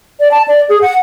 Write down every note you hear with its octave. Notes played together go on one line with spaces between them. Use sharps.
D5
A5
D5
G#4
F#5